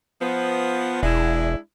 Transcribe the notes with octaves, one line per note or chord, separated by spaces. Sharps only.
F3 B3
E1 G#3 D4 E4